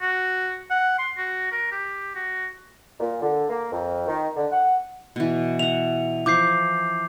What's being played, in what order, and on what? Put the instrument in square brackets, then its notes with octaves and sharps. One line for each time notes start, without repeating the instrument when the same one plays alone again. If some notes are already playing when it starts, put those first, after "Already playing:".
[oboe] F#4
F#5
C6
F#4
A#4
G4
F#4
[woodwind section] A#2
D3
A#3
F2
D#3
D3
F#5
[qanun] B2 E3
[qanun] E5 F#5 [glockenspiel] F7
[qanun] E3 F3 [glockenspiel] D6 G6 C7